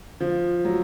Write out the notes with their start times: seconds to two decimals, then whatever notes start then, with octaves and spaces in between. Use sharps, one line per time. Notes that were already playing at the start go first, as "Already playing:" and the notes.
0.21 F3
0.65 F#3